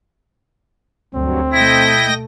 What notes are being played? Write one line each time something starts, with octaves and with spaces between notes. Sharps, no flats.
D2 G2 F#3 C4
B2 A3 E4 D#5 G5 A#6